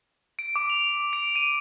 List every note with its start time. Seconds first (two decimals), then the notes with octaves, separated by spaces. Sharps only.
0.39 D7
0.56 D6
0.70 F7
1.13 D7
1.36 D#7